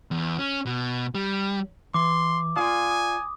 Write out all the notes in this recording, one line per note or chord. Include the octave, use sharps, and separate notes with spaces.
E2
C#4
B2
G3
E3 C6 D6
F4 D5 F5 G#5 D#6
D#6